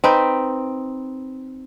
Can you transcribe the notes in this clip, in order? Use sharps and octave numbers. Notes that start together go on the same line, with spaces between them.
C4 D#4 B4